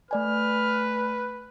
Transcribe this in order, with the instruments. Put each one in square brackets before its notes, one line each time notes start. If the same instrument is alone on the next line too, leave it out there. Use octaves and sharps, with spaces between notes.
[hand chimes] A3 D5 G#5 [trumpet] B4 [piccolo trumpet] F6